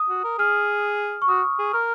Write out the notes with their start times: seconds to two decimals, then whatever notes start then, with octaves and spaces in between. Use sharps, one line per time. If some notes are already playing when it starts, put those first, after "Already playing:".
Already playing: D#6
0.09 F#4
0.24 A#4
0.38 G#4 F6
1.22 C#6
1.28 F#4 D#6
1.59 G#4
1.73 A#4 F6